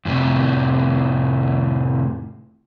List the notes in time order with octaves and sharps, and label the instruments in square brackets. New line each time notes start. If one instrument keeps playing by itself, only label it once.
[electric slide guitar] F2 A2 C3 F3